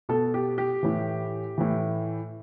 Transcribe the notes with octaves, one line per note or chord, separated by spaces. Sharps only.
B2 A4
G4
G4
A2 E3
A2 E3